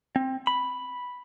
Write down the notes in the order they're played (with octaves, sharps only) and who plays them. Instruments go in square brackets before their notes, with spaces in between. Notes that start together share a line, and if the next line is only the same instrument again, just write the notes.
[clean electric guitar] C4
B5